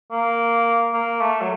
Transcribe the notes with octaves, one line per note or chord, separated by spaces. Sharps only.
A#3
A#3
A3
F#3